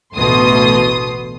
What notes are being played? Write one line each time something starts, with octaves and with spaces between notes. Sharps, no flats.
A1 D2 B2 C6 D#6